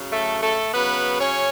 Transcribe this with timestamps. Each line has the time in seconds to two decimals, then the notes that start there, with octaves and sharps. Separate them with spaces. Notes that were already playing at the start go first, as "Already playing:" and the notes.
Already playing: C#3 F#3
0.10 A3 A4
0.42 A3 A4
0.73 C#3 F#3 B3 B4
1.20 C#4 C#5